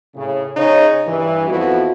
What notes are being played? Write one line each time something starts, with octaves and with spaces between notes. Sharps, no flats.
A2 C#3
C#3 D#4 C#5
G2 E3
F2 B3 E4 F#4